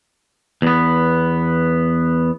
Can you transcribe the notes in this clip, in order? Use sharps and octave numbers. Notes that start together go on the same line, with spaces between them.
E2 B3